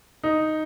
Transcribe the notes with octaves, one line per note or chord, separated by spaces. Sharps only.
D#4